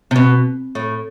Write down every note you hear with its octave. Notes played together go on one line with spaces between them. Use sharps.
C3
B2
A2